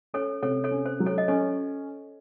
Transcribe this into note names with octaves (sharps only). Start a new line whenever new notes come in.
C#4 A4 C#5
C3 A4 C#5
A4 C#5
C#4
C5
F#3
A4 C#5
D#5
C#4 A4 C#5